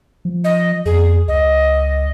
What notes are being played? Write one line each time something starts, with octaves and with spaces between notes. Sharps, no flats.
F3
D#5
F2 G#4
C#2 D#5